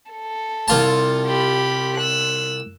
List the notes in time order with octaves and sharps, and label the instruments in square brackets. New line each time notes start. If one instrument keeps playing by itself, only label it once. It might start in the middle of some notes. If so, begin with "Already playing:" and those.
[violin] A4
[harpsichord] C2 F4 A5
[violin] G4 B5
E6 F#6